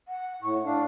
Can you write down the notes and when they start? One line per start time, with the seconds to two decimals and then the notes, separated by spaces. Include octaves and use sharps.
0.08 F#5
0.42 A2 C#6
0.65 D4 F5